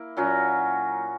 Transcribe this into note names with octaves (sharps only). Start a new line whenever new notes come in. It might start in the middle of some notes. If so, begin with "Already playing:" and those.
Already playing: A#3 E4
A#2 F#3 C#4 F#4